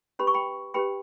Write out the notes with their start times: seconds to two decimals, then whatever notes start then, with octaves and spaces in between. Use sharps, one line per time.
0.19 C#4 G4 B4 B5
0.27 C#6
0.34 G5 B5
0.74 C#4 G4 B4 G5 B5